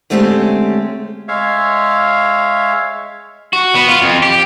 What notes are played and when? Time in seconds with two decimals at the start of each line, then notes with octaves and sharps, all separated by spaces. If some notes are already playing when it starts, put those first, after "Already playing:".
0.10 D3 G#3 A3 C4 C#4 G4
1.28 G#3 C#5 E5 F5
3.53 F#4
3.75 B3
3.88 F4
4.02 F2
4.22 G4